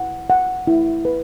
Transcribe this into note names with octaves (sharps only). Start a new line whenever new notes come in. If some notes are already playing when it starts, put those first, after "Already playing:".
Already playing: E4 F#5
F#5
E4
B4